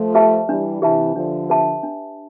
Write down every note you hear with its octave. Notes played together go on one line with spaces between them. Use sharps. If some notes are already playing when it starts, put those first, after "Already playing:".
Already playing: F3 A3
G4 B4 E5 A5
E3 G3 D4
C3 E3 G4 B4 E5 A5
D3 F3 D4
G4 B4 E5 A5
D4